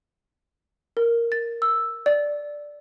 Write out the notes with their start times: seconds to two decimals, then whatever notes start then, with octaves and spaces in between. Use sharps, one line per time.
0.97 A#4
1.32 A6
1.62 E6
2.06 D5